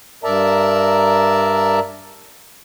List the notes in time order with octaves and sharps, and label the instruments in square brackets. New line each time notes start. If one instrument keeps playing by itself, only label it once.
[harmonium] G2 A#4 D5 E5 A5 A#5